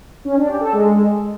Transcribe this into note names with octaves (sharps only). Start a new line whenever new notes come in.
C#4
D4
G4
A4
G#3